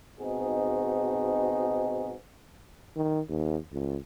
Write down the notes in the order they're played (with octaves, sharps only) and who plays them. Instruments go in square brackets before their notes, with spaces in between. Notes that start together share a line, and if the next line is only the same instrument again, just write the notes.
[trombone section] G#2 B2 C4 D#4 F#4 G#4
[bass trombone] D#3
D#2
C#2